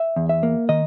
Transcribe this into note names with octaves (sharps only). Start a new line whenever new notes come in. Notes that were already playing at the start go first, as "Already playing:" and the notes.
Already playing: E5
E2
E5
A#3
D#3 D#5